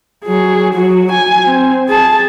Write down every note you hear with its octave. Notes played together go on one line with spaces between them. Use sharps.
F#3 G#4
F#3 F#4
G#5
C4
G#4 A5